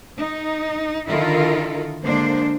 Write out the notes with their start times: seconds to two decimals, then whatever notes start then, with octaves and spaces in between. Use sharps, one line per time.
0.19 D#4
1.08 D3 D#3 E4 F4 A4 A#4
2.04 D3 G#3 A#3 D4 C5